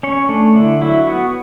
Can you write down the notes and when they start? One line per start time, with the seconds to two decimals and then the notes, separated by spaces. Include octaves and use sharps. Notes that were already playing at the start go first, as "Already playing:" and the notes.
0.03 C#4 C#5
0.29 A3 D4
0.55 D3 E4
0.81 F#3 E4
1.07 B3 F#4